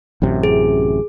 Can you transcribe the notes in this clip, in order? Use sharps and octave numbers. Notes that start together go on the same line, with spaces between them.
A1 F#2 C3
G#4